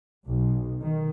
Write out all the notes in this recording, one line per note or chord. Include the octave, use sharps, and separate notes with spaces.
B1
D#3